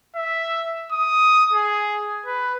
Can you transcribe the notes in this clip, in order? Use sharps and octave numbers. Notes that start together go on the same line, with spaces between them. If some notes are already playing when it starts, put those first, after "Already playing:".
E5
D#6
G#4
B4